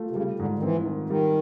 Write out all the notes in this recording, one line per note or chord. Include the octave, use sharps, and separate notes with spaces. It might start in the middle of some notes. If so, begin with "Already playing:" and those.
Already playing: A3 F4
C3
C#3 G3
G#2 D3
D#3
E3 C4
D#3
D#3 G3